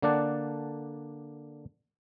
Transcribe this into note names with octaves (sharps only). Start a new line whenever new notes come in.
D3 A#3 D4 D5 F#5 A5